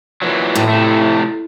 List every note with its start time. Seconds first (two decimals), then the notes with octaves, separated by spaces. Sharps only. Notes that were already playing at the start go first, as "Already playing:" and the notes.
0.22 A#2 E3 F#3
0.55 A2
0.69 C3 A3